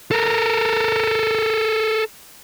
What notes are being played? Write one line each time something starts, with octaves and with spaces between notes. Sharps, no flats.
A4 A#4